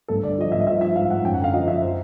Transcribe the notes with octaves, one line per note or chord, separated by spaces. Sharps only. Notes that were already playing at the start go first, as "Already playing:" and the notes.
G2 A4
D3 D5
F3 D#5
G2 E5
D#5
F3 E5
F3 E5
G#2 F5
G#2 F#5
F#2 G5
F#5
D3 F5
F3 D#5
F#2 E5
C5